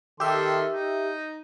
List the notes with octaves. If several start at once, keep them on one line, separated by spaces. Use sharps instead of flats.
D#3 G4 A4 E5 C6
D#4